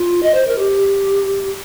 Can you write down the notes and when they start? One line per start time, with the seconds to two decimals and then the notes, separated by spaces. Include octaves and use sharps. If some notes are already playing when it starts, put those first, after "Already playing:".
Already playing: F4
0.23 D#5
0.34 C5
0.47 A#4
0.58 G4